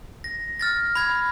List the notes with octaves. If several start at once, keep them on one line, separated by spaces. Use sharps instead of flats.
A#6
F6 A6 A#6
B5 G#6